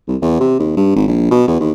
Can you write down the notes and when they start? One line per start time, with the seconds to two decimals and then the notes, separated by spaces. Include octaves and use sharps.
0.08 C2
0.22 E2
0.41 C3
0.59 D#2
0.77 G2
0.96 G#1
1.08 A#1
1.31 B2
1.48 E2
1.61 D#2